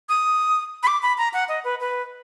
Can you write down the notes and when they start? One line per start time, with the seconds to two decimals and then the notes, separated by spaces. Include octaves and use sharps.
0.09 D#6
0.83 B5
0.87 D6
1.03 B5
1.18 A#5
1.34 F#5
1.49 D#5
1.64 B4
1.80 B4